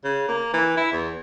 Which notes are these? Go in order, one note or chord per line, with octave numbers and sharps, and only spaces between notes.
C#3
A#3
E3
E4
E2